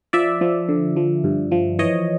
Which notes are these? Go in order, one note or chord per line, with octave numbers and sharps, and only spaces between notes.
F3 D5 E5
F3
D3
F3
G2
F3
E3 C#5 D#5